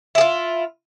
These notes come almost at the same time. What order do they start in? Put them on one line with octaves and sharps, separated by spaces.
E4 G#4 F4